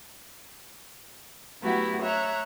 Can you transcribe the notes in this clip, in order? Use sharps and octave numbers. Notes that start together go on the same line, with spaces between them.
F#3 A3 B3 E4 F#4 G4
C#5 E5 A#5 F#6